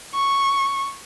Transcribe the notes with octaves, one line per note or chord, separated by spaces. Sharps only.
C#6